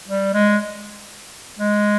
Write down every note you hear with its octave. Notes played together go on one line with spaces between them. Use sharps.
G3
G#3
G#3